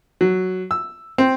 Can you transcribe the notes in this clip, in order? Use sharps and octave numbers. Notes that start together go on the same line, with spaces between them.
F#3
E6
C4